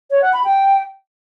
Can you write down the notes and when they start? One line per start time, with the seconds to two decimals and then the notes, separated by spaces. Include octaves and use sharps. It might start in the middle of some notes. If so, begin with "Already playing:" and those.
0.11 C#5
0.22 F#5
0.33 B5
0.44 G5